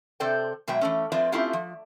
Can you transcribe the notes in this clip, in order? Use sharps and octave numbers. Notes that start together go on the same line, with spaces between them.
C3 A4 C5 D5 G5
B2 F#3 G#3 E5 G5
E3 A3 C#4
F3 C4 F4 B4 D5 E5
A3 C4 C#4 E4 F4 G4
F3